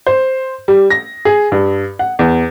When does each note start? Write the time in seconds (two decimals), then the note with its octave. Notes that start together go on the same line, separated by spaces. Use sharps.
0.07 C5
0.68 G3
0.90 A#6
1.25 G#4
1.52 G2
1.99 F#5
2.19 E2